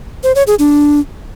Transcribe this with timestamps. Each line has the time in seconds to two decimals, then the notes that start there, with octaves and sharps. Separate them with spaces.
0.23 C5
0.35 C#5
0.47 G#4
0.59 D4